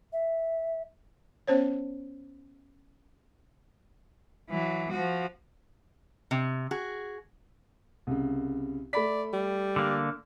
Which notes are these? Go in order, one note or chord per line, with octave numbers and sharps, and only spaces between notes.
E5
B3 C#4 C5 C#5
E3 F#3
F3 F#4
C3
F#4 G#4
C2 C#3
A3 D5 B5 B6
G3
D3 A#3